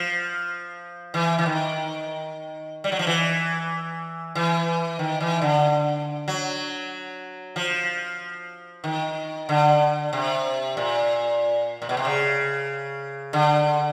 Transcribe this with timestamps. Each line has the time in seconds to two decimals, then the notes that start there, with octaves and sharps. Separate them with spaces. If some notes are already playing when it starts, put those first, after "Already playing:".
Already playing: F3
1.14 E3
1.39 E3
1.46 D#3
2.84 G3
2.92 F#3
2.99 F3
3.07 E3
4.35 E3
4.99 D#3
5.20 E3
5.42 D3
6.28 F#3
7.56 F3
8.84 D#3
9.49 D3
10.13 C3
10.77 A#2
11.82 A#2
11.89 B2
11.97 C3
12.05 C#3
13.33 D3